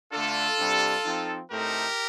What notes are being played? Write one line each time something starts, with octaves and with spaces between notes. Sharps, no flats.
D3 A3 D4 F4 A4
C3 G3 D4
F3 C4 D#4
A2 A3 C4 D#4 G4 A#4